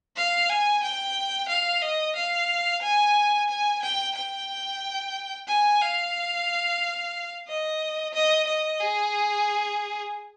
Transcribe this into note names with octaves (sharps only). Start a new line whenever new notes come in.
F5
G#5
G5
F5
D#5
F5
G#5
G#5
G5
G5
G#5
F5
D#5
D#5
D#5
G#4